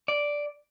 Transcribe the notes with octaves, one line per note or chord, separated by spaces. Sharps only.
D5